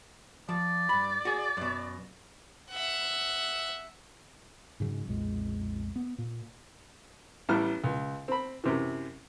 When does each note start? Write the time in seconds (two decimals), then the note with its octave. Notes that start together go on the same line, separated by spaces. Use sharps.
0.49 F3 D5
0.89 G2 B5
1.25 F#4 G#4
1.57 F#2 B2
2.70 E5 F#5
4.80 G#2 C#3 F3 F#3
5.07 B1 F2 A#2 G#3
5.96 B3
6.18 A#2
7.49 A1 A2 G3 B3 A4 F6
7.84 C#2
8.28 C4 B5
8.64 F#2 C3 E3